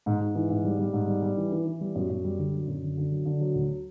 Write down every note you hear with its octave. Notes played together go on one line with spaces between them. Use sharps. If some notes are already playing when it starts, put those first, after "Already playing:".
G#2
G#2
E3
G#2
G3
G3
G#2
G3
G3
E3
E3
E3
G3
F#2
F#2
G3
D3
F#3
F#2
D3
D3
F#3
D3
F#3
D2